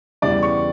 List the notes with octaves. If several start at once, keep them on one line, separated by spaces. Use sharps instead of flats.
E2 C#3 E3 G3 D5
C#6